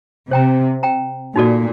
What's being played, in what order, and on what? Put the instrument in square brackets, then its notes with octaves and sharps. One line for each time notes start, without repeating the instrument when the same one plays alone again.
[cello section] C3 [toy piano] C5 G5 A#5
[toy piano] C5 G5 A#5
[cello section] A#2 [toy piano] D#4 F#4 A4 D5